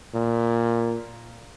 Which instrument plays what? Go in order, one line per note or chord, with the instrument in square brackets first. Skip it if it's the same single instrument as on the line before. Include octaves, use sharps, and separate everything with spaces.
[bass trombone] A#2